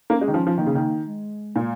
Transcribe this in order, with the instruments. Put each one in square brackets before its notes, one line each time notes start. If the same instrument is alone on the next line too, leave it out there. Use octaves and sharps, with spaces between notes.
[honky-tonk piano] A#3 [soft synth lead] C#4
[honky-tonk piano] G#3
D#3
[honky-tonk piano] F3 [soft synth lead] C#4
[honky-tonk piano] F3
[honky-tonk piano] D#3 [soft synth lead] A#3
[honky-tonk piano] C#3
D#3
[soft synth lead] G#3
[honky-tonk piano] A#2